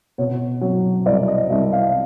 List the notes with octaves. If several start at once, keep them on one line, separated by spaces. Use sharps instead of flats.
B2 C#5
F#3
C2 D5
D#5
C2 E5
F5